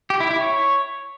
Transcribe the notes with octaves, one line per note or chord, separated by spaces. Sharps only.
G4
E4
E4
C#5